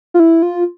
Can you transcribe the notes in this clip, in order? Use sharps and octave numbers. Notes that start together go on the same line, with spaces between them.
F4
E4
F4